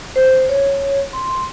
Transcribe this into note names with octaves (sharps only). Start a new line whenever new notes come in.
C5
C#5
C6